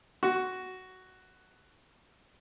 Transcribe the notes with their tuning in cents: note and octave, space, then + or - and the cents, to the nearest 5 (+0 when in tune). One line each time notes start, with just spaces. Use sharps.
F#4 +5